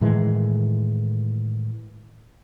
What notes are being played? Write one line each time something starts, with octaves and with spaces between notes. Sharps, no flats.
A2 D#3 E3 G#3